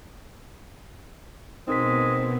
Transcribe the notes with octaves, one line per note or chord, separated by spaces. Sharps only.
B2 G#3 C4 D#4 A#4 B6